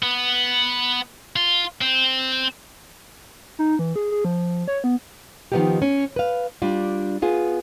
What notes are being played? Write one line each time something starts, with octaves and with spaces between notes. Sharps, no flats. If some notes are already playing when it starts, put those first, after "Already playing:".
B3
F4
C4
D#4
E3
G#4
G#4
F3
C#5
B3
D#3 F3 B3 D4 D#4 G4
C#4
B4 F5
G3 D4 F4
B3 F4 G#4